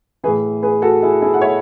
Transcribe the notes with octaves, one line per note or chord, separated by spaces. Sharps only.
A2 E3 G#4 B4
G#4 B4
F#4 A4
E4 G#4
E4 G#4
F#5
C#5 E5